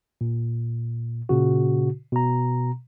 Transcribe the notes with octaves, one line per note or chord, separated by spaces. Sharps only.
A#2
A#2 C#3 F#4
B2 A#5